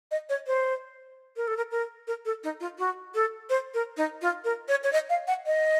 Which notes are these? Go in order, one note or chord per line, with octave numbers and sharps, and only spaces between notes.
D#5
C#5
C5
A#4
A4
A#4
A#4
A#4
A4
D#4
F4
F#4
A4
C5
A#4
D#4
F4
A#4
C#5
C#5
D#5
F5
F#5
D#5